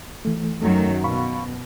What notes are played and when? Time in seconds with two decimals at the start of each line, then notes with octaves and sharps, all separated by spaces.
0.25 E3 A3
0.62 F#2 D#3 F#3 A3
1.04 B2 F5 B5 C#6